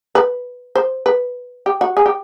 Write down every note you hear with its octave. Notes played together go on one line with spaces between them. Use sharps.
B4
C5
B4
G4
F#4
G#4
G4